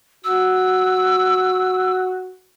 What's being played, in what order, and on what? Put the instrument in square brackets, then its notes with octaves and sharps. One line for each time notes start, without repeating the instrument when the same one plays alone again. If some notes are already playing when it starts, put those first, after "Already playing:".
[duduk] F#4 [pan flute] E6